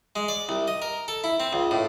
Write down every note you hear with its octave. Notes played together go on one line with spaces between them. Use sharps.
G#3
D5
C2
D#5
A#4
A4
E4
C4
C#2
A2